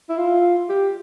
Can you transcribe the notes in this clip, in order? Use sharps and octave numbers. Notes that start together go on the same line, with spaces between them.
E4
F4
G4